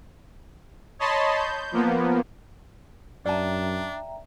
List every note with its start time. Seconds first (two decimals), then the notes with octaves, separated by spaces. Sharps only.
0.99 C#5 D#5 A5 B5 C6
1.37 G6
1.72 F3 A#3 B3
3.26 F#2 D4 D5 E5 G5 A5 A#5